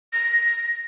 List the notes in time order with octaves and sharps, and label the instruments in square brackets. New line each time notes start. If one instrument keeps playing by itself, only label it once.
[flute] A#6